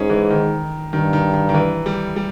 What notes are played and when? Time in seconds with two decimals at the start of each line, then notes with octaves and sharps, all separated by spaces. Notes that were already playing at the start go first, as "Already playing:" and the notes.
Already playing: G#2 C#4 G#4
0.10 E3
0.30 D#3
0.93 G2 D#3
1.13 D#3
1.34 D#3
1.49 D#3
1.54 E3
1.86 G3
2.16 G3